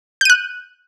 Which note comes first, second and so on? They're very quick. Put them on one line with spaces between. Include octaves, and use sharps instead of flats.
G6 D#7 F#6